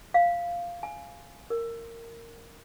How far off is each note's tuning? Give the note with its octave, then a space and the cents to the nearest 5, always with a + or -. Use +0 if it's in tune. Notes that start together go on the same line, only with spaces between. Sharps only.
F5 -5
G#5 +10
A#4 -15